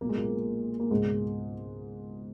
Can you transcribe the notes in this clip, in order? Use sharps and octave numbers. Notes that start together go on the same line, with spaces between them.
B1 A#2 A#3
G#3
A#2 A#3
A#3
C#2 G#2 B2 G#3